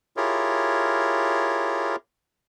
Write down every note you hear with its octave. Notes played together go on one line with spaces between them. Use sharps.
E4 F4 G4 G#4 A#4 C#5